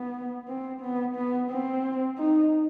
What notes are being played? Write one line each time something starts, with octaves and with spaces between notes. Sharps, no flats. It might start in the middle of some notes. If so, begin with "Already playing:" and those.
Already playing: B3
C4
B3
B3
C4
D#4